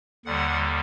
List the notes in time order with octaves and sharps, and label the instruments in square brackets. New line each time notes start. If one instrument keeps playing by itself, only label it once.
[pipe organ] D#2 D3 G3 F#5